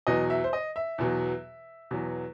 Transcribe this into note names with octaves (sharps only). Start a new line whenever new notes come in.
E2 B2 F#3 D#5
E5
C5
D#5
E5
E2 B2 F#3
E2 B2 F#3